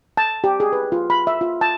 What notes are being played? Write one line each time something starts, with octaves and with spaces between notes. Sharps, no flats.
A5
G4
G#4
B4
F4
B5
E5
F4
A5